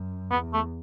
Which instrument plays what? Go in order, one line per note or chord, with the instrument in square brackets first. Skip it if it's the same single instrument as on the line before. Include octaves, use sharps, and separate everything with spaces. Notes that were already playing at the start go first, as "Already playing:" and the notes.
Already playing: [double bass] F#2
[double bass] E2 [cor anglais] B3
[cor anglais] A3